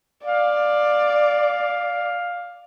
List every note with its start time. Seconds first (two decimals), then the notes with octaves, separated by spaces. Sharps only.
0.25 D5 F5